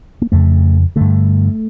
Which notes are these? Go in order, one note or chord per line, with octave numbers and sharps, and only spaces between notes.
A#3
F2 C#3 A3
G2 D3 A3